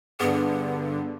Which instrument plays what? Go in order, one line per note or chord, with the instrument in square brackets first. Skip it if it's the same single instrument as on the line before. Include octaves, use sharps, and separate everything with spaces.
[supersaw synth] G2 D3 [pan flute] B3 [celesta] G#4 B4 F#5